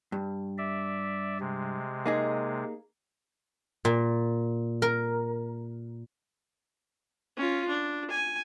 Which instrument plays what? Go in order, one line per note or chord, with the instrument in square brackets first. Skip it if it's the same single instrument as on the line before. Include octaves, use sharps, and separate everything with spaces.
[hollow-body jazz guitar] G2
[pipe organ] D5 E5
C3 G#3
[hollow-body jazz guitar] A#3 D#4 G#4
[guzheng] A#2
A#4
[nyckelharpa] C#4 F4
D4
G#5